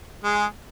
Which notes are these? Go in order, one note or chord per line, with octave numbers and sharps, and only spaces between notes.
G#3 G#4